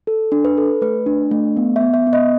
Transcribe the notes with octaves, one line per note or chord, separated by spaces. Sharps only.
A4
D4
B4
A4
A3 B4
D4
A3
B3
E5
B3
E5
B3
D#5